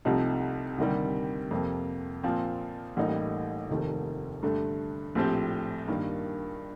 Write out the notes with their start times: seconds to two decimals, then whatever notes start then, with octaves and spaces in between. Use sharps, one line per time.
0.05 C2 C3 F3 A3 D#4
0.78 D2 C3 D#3 G3
1.51 F2 C3 F3 A#3
2.23 A#2 F3 C4 F4
2.97 A1 A2 G3 A#3 D#4
3.70 F1 D#2 D#3 A3
4.42 G2 D3 A3
5.15 A#1 A2 F3 C4 G4
5.88 G2 D#3 A#3